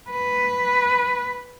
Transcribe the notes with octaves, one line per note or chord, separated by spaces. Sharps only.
B4